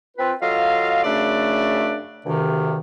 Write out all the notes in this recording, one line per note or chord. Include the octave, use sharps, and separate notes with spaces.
C4 F4 B4
F#3 F4 A4 D#5 F5
F#2 C#3 A3 D4 D5 E5
D2 G2 C3 D#3